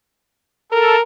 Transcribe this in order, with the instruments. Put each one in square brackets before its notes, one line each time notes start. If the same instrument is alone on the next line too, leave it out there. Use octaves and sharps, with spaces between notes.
[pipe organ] A4 [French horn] A#4